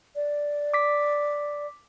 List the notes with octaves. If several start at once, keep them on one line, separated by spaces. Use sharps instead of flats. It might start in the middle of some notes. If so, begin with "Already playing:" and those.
D5
D6 B6